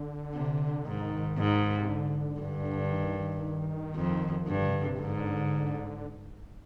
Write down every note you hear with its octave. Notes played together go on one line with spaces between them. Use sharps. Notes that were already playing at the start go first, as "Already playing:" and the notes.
Already playing: D3
C3
G#2 D#3
G#2
C3
D3
G2
D#3
D#3
F2
D#3
G2 D3
D3
C3
D3
C3
G#2 D3